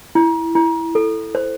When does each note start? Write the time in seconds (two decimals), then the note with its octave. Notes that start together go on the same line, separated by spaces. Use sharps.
0.15 E4
0.55 E4
0.95 A4
1.35 C5